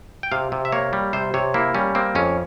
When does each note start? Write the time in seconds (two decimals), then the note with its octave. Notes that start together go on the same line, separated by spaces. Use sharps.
0.23 G5
0.31 C3 F5
0.52 C3
0.65 E5
0.72 A#3 C#5
0.93 G3
1.13 C3 C5
1.34 C3 C#5
1.54 A#3 E4
1.75 G3 C#4
1.95 A#3 C4
2.15 F2 C#4